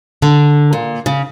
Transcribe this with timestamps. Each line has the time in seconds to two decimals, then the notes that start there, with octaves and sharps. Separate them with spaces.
0.22 D3
0.73 A#2
1.06 C#3